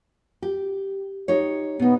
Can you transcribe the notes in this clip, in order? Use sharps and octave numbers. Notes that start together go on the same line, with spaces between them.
G4
D#4 G4 C#5
B2 B3 D#4